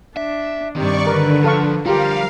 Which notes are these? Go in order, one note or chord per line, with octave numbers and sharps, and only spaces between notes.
D4 E5
G2 C3 D#3 D5 C#6
D3 A#4 B4
F3 A4 F5 C#6
F3 G3 F4 G4 A#4 F5